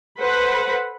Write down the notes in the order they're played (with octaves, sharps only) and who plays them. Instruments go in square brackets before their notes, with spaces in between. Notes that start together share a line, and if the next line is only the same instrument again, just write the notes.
[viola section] A4 B4 C5 F#5 B5